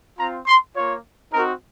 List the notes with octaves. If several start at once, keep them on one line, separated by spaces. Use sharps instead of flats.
C4 F4 A#5
C6
A#3 F4 C#5
C4 D#4 F#4 A#4